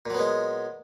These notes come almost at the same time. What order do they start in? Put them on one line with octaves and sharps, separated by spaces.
A#2 F#3 B3 G#3